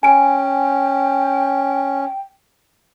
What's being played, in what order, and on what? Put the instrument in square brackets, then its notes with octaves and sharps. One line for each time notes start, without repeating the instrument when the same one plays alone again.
[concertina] C#4 [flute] G5 [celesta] G#5 D7